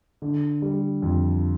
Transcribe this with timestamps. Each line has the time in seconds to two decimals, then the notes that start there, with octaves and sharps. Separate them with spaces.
0.22 D3
0.62 G3
1.02 F2